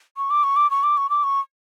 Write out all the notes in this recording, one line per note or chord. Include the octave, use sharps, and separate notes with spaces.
C#6
D6
C#6
D6
C#6
D6
C#6
D6
C#6